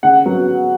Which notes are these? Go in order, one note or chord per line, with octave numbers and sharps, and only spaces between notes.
C#3 F#5
F#3 B3